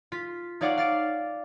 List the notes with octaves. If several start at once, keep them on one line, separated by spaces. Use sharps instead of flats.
F4 B6
D#4 C#5 D5 F5 F#5 D6
F5 A6 D7